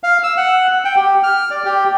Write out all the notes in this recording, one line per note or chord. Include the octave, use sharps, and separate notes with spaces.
F5
E6
F#5
G5
G4
F6
D5
G4